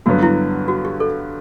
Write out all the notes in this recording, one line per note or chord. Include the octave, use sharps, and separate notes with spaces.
G2 D3 F#3 B3 F#4
E4
F#4
G4
A4